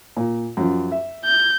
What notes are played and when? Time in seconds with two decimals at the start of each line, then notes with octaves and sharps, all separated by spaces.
0.17 A#2
0.57 F#2 F3
0.92 E5
1.25 G6